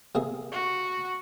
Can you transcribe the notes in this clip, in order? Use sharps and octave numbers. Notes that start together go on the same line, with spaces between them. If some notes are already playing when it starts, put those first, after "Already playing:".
C3 A#3 G#4
F#4